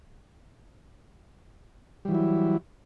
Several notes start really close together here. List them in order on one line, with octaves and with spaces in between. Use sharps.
G3 E3 F#3 E4